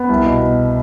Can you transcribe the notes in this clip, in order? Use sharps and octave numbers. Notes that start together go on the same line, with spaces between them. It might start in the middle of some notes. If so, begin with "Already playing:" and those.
Already playing: B3
C2
B2
B2